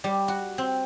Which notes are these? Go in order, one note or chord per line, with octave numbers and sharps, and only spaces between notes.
G3
F#4
C4